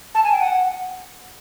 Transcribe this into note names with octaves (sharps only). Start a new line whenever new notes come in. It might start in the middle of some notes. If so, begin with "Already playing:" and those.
A5
G#5
G5
F#5